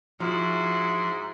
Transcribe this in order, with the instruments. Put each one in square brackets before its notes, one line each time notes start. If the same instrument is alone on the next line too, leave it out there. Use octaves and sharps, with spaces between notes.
[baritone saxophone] G#2 [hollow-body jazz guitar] F3 [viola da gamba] E4 F#4